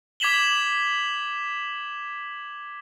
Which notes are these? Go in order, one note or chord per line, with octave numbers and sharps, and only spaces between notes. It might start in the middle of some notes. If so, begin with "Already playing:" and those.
D6 G#6 B6 E7 F#7 G7